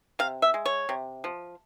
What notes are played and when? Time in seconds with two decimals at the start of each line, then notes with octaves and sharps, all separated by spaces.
0.19 C3 F5
0.42 E5
0.54 G#3
0.66 C#5
0.89 C3
1.24 F3